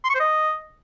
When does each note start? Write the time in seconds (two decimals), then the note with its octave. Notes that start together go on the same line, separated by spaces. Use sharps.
0.04 C6
0.09 C#6
0.15 C5
0.20 D#5